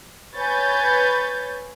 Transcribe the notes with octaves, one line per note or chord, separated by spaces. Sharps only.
B4 C#5 G#5 G6 A6